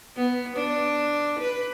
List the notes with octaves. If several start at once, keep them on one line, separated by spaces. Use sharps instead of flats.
B3
D4
B4